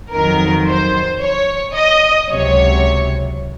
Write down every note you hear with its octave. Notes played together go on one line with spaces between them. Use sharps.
F2 D#3 F#3 A#4
C5
C#5
D#5
C#2 C3 F#3 C#5